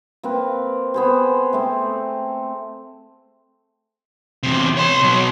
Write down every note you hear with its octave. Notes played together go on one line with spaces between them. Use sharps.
A#3 C4 B4
B3 G#4 C5
A3 C4
E2 C3
C#5 C6
B2 F#3